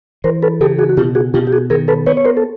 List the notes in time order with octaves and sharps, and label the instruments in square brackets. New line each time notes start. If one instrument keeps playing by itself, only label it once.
[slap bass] E3 [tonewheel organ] A#4 C5
[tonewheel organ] A4 B4
[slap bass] C#3 [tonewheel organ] G4 A4
[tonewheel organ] F#4 G#4
F#4
[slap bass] B2 [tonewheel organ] F4 G4
[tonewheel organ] F#4 G#4
[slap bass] B2 [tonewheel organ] F4 G4
[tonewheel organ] G4
F#4 G#4
[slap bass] D#3 [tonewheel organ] G#4 A#4
[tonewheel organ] A4 B4
[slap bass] B3 [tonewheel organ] B4 C#5
[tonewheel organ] C#5
A#4 C5
A4